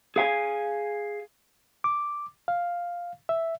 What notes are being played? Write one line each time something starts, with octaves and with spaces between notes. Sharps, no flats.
G#4 F5 G#5
D6
F5
E5